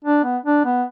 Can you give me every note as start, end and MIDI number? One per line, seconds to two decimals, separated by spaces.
0.05 0.22 62
0.24 0.37 59
0.46 0.64 62
0.66 0.83 59